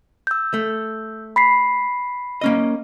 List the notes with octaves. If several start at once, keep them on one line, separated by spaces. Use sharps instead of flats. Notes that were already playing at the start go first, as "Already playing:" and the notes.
E6 G6
A3
B5 B6 C7
A#3 C#4 D#5